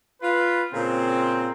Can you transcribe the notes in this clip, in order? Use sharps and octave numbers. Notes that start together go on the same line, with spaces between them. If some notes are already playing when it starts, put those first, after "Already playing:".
F4 B4
A#2 C#3 C4